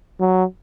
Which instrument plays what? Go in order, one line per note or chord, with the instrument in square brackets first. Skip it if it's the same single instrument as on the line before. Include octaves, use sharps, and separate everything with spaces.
[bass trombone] F#3